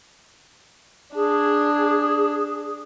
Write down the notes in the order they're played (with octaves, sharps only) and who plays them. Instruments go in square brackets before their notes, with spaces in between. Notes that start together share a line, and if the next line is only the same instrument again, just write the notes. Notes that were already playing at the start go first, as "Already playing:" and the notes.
[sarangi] D4 [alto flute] G#4